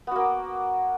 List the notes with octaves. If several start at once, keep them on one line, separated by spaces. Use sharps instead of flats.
A#3 B3 F#4 D5